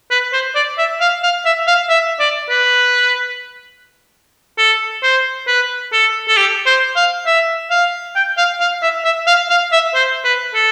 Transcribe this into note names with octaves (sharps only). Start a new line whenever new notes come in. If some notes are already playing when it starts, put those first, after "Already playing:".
B4
C5
D5
E5
F5
F5
E5
F5
E5
D5
B4
A4
C5
B4
A4
A4
G4
C5
F5
E5
F5
G5
F5
F5
E5
E5
F5
F5
E5
C5
B4
A4